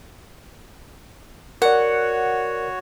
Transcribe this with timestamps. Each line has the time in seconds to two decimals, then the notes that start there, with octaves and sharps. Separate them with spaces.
1.62 F#4 A#4 C#5 D5 F#5